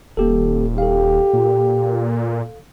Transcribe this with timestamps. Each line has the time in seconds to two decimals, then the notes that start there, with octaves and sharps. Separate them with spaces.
0.17 D#1 A#3 G4 A4
0.78 G4 A4 F5
1.33 A#2